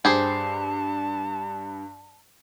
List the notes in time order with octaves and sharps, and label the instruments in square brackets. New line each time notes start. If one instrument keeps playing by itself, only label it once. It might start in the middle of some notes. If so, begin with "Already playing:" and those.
[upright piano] G2 C7 [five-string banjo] G4 G#4 C5 [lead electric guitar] A5